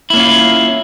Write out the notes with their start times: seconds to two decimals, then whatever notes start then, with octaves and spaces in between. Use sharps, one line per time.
0.10 E4
0.13 A#3
0.17 C#4
0.20 F4